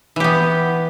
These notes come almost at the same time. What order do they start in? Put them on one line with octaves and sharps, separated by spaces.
E3 G4 B3